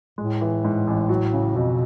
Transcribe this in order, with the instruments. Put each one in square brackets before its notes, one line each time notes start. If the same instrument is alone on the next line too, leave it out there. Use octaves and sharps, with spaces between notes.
[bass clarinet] A2 [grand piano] G#3
[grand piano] E3
G#2
A1
F#3
C#3
[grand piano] F2 [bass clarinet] B2